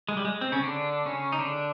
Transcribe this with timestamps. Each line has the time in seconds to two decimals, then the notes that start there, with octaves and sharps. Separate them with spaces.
0.09 G#3
0.17 G3
0.25 G#3
0.41 C4
0.52 C#3 C#4
0.63 D3 D4
1.06 C#3 C#4
1.32 D#4
1.38 D3 D4